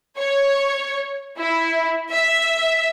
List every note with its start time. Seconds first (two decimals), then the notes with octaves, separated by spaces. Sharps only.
0.18 C#5
1.38 E4
2.12 E5